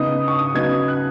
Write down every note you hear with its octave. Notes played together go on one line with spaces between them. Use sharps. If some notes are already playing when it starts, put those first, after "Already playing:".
Already playing: C#3 B3 D#4 D#6
C#6
D#6
C#3 F#3 B3 D#4 G#6
F#6